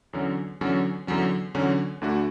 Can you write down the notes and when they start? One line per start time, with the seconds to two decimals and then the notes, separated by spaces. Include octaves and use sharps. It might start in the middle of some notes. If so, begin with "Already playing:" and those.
0.13 E2 D3 F#3 C#4
0.61 E2 D3 F#3 C#4
1.07 E2 D3 F#3 C#4
1.54 E2 D3 F#3 C#4
2.01 D2 D3 A3 D4 F#4